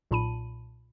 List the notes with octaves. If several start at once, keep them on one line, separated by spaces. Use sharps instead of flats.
B1 A#2 A5 B5 D#7